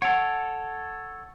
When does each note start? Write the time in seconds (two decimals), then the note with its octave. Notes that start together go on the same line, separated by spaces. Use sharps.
0.02 A4 C#5 F#5 D7 F7